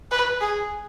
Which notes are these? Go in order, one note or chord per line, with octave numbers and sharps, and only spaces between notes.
B4
G#4